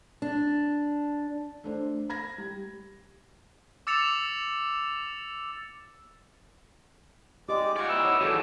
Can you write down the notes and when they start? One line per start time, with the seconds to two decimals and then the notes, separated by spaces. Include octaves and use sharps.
0.22 D4
1.64 A3 D4 C5
2.09 B5 G#6 A#6
2.38 G3
3.87 D6 E6 A6 C#7 E7 F7
7.49 G#3 G4 D5 D#5 D6
7.76 F4 F#4 D5 G#5 C#6
7.89 B3 D#4 E4 E6
8.05 C#5
8.21 D#2 E3 F#4 G#4 A4 D5